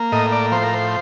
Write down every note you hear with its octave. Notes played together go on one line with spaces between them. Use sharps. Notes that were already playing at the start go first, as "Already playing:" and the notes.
Already playing: A#3
A2 D#5
D5
F3 C5
A#4
C5